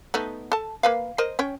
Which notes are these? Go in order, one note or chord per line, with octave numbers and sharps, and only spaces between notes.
A3 B3 D#4
A4 A5
A#3 B4 F5
A#4 C5 D#5
C#4 C#5 G5